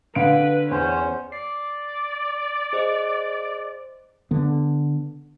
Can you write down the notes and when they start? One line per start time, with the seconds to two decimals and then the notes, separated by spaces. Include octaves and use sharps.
0.15 D3 B4 F5 D7
0.71 E2 C#4 C5 C#5
1.32 D5 C7
2.73 G#4 C5 D#5
4.31 D3 B3